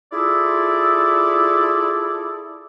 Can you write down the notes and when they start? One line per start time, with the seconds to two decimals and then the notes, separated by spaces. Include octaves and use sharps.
0.12 E4 F4 G#4 A4 D5